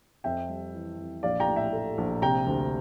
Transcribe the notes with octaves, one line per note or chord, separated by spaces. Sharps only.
F2 E5 G5
G3
E3
F2
A#1 D5 F5
G5 A#5
A2
E5 G5
A3
A#1
C3 G5 A#5
D2